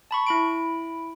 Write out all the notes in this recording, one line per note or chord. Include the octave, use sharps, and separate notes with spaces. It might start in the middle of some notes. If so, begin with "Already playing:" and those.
A5 B5 C#6
E4 B5 D7